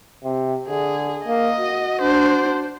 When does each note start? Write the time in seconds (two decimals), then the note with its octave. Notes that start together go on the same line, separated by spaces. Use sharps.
0.24 C3
0.69 D3 G#4
1.26 A#3 D#5
1.60 F#4
2.02 D4 C5